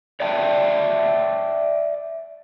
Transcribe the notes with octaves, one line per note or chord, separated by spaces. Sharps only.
C#5 D5 E5 G5 A5